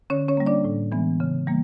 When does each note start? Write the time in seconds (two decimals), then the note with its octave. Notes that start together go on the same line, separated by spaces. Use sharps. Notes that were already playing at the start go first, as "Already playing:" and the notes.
0.10 D3 C#4 C#5
0.28 C#4 C#5
0.37 G3 A#3
0.46 D4 D5
0.64 A2
0.92 E3 G#3 B3
1.20 C#3
1.47 E3 G3 A#3